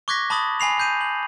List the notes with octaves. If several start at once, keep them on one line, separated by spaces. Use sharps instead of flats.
C#6 D6 F#6 G#6 A#6 B6
A5 B5 C#6 D#6 A6 F#7
G#5 B5 C7 F7
G6 C7 D#7
F#7